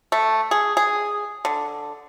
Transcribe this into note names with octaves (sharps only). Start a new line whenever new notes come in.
A3
G#4
G#4
D3